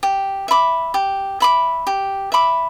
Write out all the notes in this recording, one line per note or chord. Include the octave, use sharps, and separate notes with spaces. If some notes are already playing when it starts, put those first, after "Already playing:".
G4
E5 B5 D6
G4
E5 B5 D6
G4
E5 B5 D6